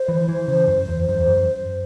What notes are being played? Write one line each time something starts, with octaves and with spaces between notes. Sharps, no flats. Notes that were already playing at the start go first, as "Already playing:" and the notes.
Already playing: C5
E3
E3
C#3
F#2
E2
F#2
E2
F#2